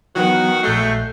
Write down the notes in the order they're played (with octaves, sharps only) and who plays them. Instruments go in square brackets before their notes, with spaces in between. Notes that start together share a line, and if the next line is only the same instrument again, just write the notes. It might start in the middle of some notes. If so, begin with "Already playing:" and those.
[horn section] D#3 F#4 [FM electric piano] E3 F#3 B3
[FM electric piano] A#1 G6 C7 [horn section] F#3 G#3 A3